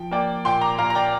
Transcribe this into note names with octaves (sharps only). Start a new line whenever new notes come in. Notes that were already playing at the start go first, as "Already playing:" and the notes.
Already playing: F3 G5
A#3 D5 G5
A#2 G5 C6
A#5 D6
A#2 F5 A#5
A#5
D5 G5